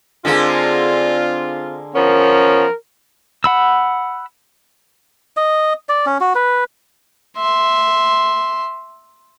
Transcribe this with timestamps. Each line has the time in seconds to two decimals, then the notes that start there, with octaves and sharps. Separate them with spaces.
0.25 D3 G#3 A#3 C4 F4
1.95 F3 B3 C#4 A#4
3.44 F#5 B5 E6
5.37 D#5
5.89 D5
6.06 C#4
6.20 F#4
6.35 B4
7.37 E5 C6